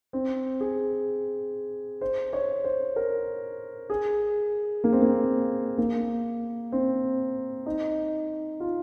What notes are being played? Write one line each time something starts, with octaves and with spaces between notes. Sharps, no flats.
C4
G#4
C5
C#5
C5
A#4
G#4
A#3
C4
A#3
A#3
C4
D#4
F4